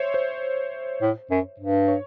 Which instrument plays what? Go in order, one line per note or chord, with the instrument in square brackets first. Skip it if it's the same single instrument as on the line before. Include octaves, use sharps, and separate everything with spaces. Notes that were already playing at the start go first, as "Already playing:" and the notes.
Already playing: [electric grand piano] C5 C#5 E5
C5
[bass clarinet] A2
F#2
G2
[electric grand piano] C#5